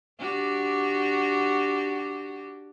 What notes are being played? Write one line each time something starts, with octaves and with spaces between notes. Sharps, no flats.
D4 F#4 G4